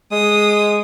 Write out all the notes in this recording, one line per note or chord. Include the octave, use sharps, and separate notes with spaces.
G#3 D#6